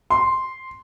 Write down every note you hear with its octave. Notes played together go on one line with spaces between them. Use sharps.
C6